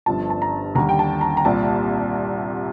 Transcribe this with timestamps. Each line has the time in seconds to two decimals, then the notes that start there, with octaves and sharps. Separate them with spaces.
0.06 G1 G2 F3 A5
0.30 A5
0.42 A#5
0.75 D#2 D3 G3 A#5
0.89 G5
0.99 A5
1.21 A#5
1.37 A#5
1.45 C2 A#2 G3 A5